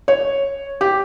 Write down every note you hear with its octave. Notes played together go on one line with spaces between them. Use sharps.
C#5
G4